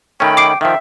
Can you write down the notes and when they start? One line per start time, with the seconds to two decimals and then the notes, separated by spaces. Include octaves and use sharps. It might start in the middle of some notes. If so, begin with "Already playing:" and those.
0.20 D#3 A3 C#4 D#5 F#5 G5 B5
0.37 D6 C7 D7
0.61 D#3 F3 E5 F5 G5